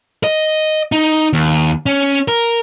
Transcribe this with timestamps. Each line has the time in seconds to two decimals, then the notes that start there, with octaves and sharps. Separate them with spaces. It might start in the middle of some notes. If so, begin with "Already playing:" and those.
0.24 D#5
0.92 D#4
1.33 D#2
1.86 C#4
2.28 A#4